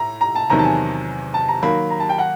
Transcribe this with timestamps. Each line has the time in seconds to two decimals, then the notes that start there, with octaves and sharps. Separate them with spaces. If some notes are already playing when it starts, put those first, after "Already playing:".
Already playing: A2 A#5
0.21 A#5
0.35 A5
0.50 E2 C3 D#3 F#3 A#5
0.59 A5
0.64 G#5
1.34 A5
1.49 A#5
1.62 D#3 F#3 A#3 B5
1.90 A#5
2.00 A5
2.09 G5
2.18 F#5